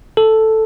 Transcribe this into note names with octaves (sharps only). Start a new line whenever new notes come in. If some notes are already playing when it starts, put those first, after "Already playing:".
A4